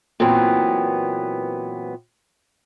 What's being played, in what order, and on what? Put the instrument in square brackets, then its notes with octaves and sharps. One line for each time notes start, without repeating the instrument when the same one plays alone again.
[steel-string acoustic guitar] A#2 E3 F#3 B3 C4